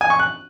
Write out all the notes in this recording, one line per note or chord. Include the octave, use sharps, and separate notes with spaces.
G#5
C#6
F#6